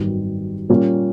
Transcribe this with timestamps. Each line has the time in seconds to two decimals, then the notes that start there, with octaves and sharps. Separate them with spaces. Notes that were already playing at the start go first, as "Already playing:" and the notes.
Already playing: G#1 F#2 D#3 G3 B3
0.69 A#2 G3 A#3 C#4